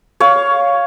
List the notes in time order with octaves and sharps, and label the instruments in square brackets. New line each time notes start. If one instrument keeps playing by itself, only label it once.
[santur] C#5 F5